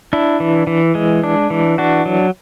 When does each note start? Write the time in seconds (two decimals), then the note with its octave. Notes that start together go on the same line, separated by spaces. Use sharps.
0.13 D4 E4
0.40 E3
0.67 E3
0.95 G#3
1.24 D4
1.50 E3
1.78 D4 F#4
2.06 F#3